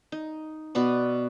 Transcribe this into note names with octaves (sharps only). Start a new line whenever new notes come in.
D#4
B2 B3 B4 D5